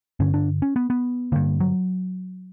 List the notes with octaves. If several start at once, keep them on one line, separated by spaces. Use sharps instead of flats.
G2 D3 C#4
D4
C#4
B3
B3
G2 D3 A#3
F#3